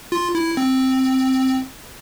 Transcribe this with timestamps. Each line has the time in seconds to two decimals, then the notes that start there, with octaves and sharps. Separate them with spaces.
0.12 F4
0.35 E4
0.57 C4